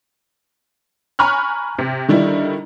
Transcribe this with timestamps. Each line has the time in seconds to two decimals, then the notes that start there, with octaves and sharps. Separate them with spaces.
1.19 G#5 A#5 B5 C#6 F6 F#6
1.79 C3
2.08 D3 D#3 G3 E4